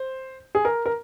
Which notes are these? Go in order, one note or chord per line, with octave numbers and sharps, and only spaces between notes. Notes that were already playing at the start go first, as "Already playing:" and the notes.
Already playing: C5
G#4
A#4
A#4